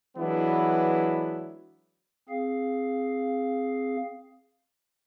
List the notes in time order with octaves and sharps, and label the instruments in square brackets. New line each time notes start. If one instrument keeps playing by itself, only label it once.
[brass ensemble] E3 F#3 G#3 B3 D4 E4
[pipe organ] C4 G#4 F5